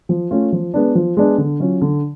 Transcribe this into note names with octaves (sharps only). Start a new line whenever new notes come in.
F3
A3 C#4 F4
F3
G#3 B3 D4
F3
G#3 B3 D4
D3
F#3 C#4 F4
D3